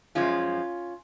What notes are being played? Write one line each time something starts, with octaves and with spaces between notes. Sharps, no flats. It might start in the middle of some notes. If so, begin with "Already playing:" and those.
F#2 F3 G#3 C#4 F4